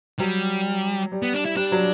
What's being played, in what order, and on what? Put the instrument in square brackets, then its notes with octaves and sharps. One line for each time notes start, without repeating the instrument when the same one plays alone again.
[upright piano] F#3 [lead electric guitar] G3
[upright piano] G3
[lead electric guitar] B3
D4
E4
[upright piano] G3 [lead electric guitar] D4
[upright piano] F#3